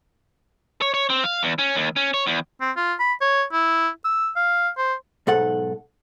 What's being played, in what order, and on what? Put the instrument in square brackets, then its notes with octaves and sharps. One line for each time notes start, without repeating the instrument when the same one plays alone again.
[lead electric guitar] C#5
C#5
C4
F5
E2
C#4
D#2
C#4
C#5
E2
[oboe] C4
F4
B5
C#5
E4
E6
F5
C5
[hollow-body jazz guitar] B1 G#2 A4 F#5